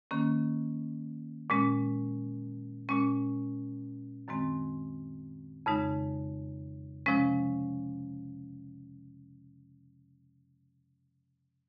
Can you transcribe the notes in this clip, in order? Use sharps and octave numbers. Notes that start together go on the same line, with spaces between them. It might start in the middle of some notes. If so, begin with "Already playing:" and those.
D#3 A#3 C#4
A#2 G#3 C#4
A#2 G#3 C#4
F#2 D#3 G#3 C4
F2 C#3 G#3 D#4
C3 F3 G#3 C#4